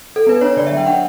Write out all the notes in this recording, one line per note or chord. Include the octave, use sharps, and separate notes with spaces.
A4
B3 B4
D4 C#5
D3 D5
E5
F#3
G5
D4 F#5